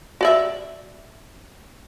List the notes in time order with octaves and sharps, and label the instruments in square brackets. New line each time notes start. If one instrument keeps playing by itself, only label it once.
[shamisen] F#4 D5 E5